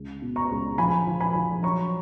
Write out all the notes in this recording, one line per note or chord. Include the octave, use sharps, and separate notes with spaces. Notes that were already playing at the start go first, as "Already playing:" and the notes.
Already playing: C#2
B2
A#5 C#6
C#2
F3 G#5 B5
F3
G#5 B5
F3
F#3 A#5 C#6